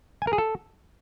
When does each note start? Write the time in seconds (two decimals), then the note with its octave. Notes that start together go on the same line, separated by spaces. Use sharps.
0.22 G#5
0.27 A#4
0.33 G#4
0.38 A4